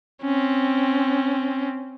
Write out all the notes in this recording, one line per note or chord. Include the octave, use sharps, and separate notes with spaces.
C4 C#4